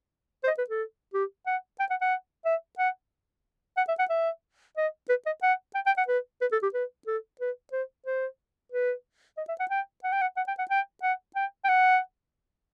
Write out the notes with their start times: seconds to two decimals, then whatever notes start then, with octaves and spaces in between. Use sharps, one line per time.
0.44 C5
0.47 D#5
0.58 B4
0.70 A4
1.14 G4
1.46 F#5
1.80 G5
1.90 F#5
2.01 F#5
2.45 E5
2.79 F#5
3.77 F#5
3.88 E5
3.99 F#5
4.10 E5
4.77 D#5
5.09 B4
5.26 D#5
5.43 F#5
5.75 G5
5.86 G5
5.98 F#5
6.08 B4
6.41 B4
6.52 A4
6.63 G4
6.74 B4
7.07 A4
7.41 B4
7.72 C5
8.06 C5
8.72 B4
9.38 D#5
9.49 E5
9.60 F#5
9.70 G5
10.04 F#5
10.12 G5
10.21 F#5
10.37 F#5
10.48 G5
10.59 F#5
10.70 G5
11.02 F#5
11.35 G5
11.64 G5
11.69 F#5